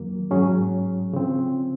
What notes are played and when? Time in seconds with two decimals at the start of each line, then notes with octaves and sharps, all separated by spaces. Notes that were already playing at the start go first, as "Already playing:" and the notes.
Already playing: F2 D#3 F#3 A#3
0.31 G#2 F#3 C#4 G#4
1.13 C#3 F3 C4